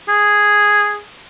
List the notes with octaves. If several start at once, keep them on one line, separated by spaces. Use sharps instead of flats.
G#4